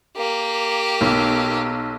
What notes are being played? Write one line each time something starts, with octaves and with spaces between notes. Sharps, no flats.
A#3 G4
B1